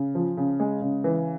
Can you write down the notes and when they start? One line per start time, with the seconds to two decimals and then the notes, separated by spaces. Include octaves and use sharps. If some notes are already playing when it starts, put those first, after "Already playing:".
Already playing: C#3
0.15 F3
0.37 C#3
0.60 G#3
0.82 C#3
1.04 E3